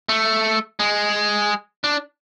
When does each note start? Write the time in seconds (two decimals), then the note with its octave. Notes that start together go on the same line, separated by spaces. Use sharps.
0.09 A3
0.80 G#3
1.84 D4